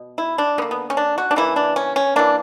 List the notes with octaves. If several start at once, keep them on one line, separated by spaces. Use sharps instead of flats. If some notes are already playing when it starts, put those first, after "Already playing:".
Already playing: B2
E4
D4
D3 A#3 B3
B3
C#4
D4
F#4
D4
C#3 E3 A#3 E4
D4
C#4
C#4
E3 A#3 D4